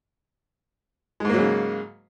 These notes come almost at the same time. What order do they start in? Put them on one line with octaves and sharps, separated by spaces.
G#3 G#2 A#3 F#3 C#3